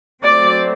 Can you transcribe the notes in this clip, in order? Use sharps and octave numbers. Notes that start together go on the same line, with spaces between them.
F#3 A3 C4 D5